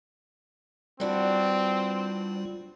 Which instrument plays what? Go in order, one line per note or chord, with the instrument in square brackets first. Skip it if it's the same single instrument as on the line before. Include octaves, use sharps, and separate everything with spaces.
[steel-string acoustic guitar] E3 D4 F#4 [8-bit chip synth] G3 F4 [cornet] C4